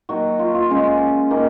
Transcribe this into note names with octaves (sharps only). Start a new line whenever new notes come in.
D#3 F#3 A#3 F#4
F4
F4
C#3 G#3 C#4
D#3 A#3 C#4